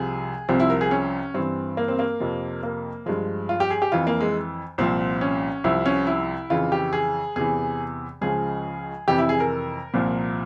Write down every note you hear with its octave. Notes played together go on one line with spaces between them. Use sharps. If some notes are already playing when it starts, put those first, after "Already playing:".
Already playing: C2 C3 F3 G#4
C2 C3 F3 C4
E4
A#4
G#4
C#4
G2 E3 C4
A#3
C4
A#3
F2 C3 F3
A#3
G2 F3 G#3
F4
G4
G#4
G4
F2 E3 F4
A#3
G#3
C2 A#2 F3 C4
C#4
C2 C3 F3 E4
C#4
E4
F2 C#3 E3 F4
G4
G#4
E2 C3 E3 G#4
C#2 C#3 F3 G#4
F2 C3 E3 G4
E4
G#4
A#4
C2 A#2 F3